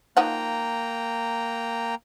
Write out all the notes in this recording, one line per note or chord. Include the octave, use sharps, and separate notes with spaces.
F3 A#3 D#4 F#5 G5 A#5